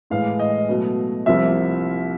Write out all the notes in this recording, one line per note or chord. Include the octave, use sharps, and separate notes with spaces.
A2 E3 G#3 F5
D#5
B2 F#3 A3
C2 C3 F3 A#3 E5